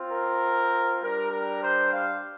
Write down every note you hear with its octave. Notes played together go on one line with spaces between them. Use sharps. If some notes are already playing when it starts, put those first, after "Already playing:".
Already playing: C4 F4
A#4
G3 D4 G4 A#4
A#4
C5
F5